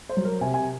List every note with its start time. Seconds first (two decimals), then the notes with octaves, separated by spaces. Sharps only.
0.09 C5
0.17 F#3
0.25 A#4
0.41 C3 G#5
0.54 G#5